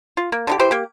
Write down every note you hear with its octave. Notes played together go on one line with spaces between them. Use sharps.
F4
A#3
D3 D#4 G4
E3 G4 C5
A#3 G4